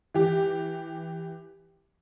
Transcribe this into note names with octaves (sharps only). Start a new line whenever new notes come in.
E3 G4